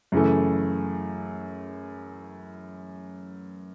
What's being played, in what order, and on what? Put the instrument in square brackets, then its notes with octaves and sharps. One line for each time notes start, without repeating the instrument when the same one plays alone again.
[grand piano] F#2 C#3 E3 A3